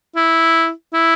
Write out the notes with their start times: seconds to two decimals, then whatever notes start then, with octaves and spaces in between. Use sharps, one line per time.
0.16 E4
0.94 E4